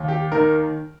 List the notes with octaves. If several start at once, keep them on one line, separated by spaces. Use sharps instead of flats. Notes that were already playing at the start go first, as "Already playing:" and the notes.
Already playing: D#2
G4
D#3 A#4